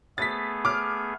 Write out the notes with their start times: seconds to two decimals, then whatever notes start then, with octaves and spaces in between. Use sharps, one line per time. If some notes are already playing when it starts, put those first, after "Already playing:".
0.18 A3 B3 G#4 A6 B6
0.65 D6 F6